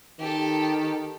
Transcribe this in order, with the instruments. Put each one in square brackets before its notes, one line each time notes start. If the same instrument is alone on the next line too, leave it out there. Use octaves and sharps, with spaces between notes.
[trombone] D#3 [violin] G4 A4